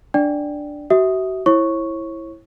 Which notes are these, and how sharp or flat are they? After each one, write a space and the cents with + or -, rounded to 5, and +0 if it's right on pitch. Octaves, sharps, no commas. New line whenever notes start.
D4 +0 D5 +0 G5 -10
F#4 +35 E5 -20 D#6 +0
E4 +0 C#5 -40 C#6 +0